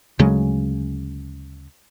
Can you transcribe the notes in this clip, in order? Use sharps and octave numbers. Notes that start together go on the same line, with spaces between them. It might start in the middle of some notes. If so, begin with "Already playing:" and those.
D2 C#3 F#3 G#3